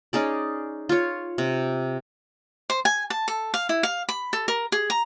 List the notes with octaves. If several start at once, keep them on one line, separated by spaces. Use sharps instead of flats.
C#4 D#4 G#4 D5
F4 C#5
C3
C5
G#5
A5
A4
F5
E4
F5
B5
A4
A#4
G#4
A#5